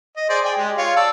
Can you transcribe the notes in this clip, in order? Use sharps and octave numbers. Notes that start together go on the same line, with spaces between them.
D#5
G#4 C5 D5
G#4 D5 G5
G#3 G4
F4 C#5 F5
D5 A5 E6